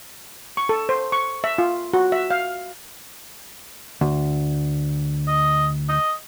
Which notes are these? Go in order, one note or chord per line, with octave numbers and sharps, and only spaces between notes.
C#6
A4
C5
C#6
E5
F4
F#4
E5
F5
D2
D#5
D#5